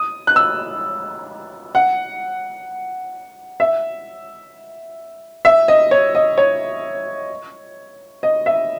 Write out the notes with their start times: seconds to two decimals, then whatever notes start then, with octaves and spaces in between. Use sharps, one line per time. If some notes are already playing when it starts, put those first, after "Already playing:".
Already playing: D#6
0.27 F#6
0.36 E6
1.75 F#5
3.60 E5
5.45 E5
5.68 D#5
5.91 C#5
6.15 D#5
6.38 C#5
8.23 D#5
8.46 E5